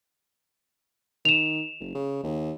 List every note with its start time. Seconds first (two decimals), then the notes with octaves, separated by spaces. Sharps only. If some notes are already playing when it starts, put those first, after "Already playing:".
1.25 D#3 E7 F7
1.80 F#1
1.95 C#3
2.24 D#2